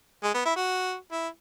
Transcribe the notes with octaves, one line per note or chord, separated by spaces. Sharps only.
G#3
B3
E4
F#4
E4